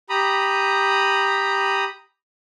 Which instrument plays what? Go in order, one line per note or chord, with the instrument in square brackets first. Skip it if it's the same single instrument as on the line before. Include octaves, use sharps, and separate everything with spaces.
[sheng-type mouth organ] G4 A#5 B5 D#6